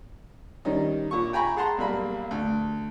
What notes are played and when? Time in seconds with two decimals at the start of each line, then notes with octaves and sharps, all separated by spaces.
0.65 D#3 G3 C#4 D#4
1.11 A#2 C#6
1.33 G5 G#5 A#5 B5 C#6
1.56 G#4 F#5 A5 A#5 C6
1.78 B1 G3 A#3 B5
2.31 D2